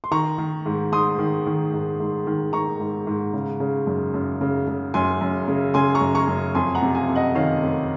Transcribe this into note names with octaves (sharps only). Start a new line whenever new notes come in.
C6
D#3 A#5 C#6
D#3
G#2
G#2 C6 D#6
D#3
D#3
G#2
G#2
D#3
D#3 A#5 C#6
G#2
G#2
C#3
C#3
F#2
F#2
C#3
C#3
F#2 G#5 C6
F#2
C#3
C#3 G#5 C6
A#5 C#6
F#2
A#5 C#6
F#2
F2 G#5 C6
F#5 A#5
C3
F5 G#5
F2
D#5 F#5
D#3 C#5 F5
F2